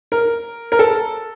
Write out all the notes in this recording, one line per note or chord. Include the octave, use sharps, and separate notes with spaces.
A#4
A#4
A4